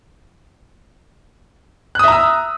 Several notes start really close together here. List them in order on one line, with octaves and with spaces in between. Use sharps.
F#6 D#6 E5 A#5 E6